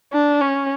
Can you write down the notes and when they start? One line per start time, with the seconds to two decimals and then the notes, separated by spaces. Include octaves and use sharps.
0.13 D4
0.41 C#4